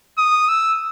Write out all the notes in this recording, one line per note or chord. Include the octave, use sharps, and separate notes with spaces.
D#6
E6